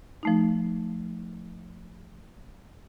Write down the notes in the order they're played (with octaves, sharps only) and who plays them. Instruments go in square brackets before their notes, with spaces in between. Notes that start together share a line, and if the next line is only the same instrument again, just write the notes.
[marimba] F3 A3 D#4